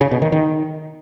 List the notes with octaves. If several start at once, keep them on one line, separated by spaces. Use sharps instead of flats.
C#3
B2
D#3
D#3